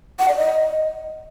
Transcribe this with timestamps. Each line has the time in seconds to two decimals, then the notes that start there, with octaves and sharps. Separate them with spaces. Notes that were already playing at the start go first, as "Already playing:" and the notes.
0.19 F#5
0.28 D5
0.37 D#5